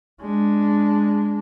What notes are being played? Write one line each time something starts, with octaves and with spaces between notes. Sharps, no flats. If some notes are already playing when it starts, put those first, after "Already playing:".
G#3 D4